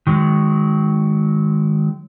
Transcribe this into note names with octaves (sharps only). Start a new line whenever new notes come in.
D#3 F#3 G#3